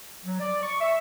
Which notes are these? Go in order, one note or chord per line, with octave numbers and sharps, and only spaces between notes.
F#3
D5
C#6
E5